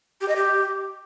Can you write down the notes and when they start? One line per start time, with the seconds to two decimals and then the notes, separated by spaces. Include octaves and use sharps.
0.21 G4
0.28 D#5
0.36 G4